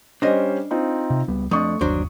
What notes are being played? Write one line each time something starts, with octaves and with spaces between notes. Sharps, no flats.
G3 C#4 D4 C5 D#5
C4 D#4 F4
C3
C#2 G3 B3
F2 A3 D4 C#6 D#6
G1 D#2 F#3 D4 C5